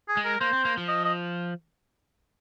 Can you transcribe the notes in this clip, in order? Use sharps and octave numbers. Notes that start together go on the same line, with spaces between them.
G#4
G#3
A#4
A#3 C5
C4
A#3
F3
D#5
D#5